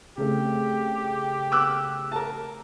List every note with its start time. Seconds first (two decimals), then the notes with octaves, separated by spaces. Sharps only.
0.18 C#3 A3 C4 G4
1.52 D6 E6 F#6
2.12 A#4 A5